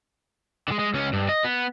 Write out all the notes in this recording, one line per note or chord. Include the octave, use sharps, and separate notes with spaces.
D3 G#3
G#3
C#2 C#4
G2
D#5
B3